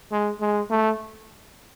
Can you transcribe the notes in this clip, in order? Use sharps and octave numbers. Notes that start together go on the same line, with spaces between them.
G#3
G#3
A3